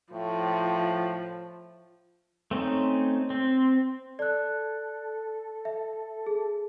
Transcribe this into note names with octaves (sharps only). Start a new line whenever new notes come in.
A2 F3
A3 C4 C#4 D#4
C4
A4 D5 F#6
E5
G#4